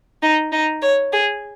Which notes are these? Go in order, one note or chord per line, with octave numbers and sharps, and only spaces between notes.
D#4
D#4
C#5
G#4